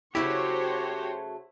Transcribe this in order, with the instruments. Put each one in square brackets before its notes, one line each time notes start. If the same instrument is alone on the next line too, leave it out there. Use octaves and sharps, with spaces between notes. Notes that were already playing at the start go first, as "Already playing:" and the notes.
[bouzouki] C#3 F#3 A3 [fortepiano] E4 [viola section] F#4 C5 C#5 [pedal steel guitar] G4